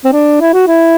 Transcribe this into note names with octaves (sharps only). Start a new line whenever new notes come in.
C4
D4
E4
F#4
E4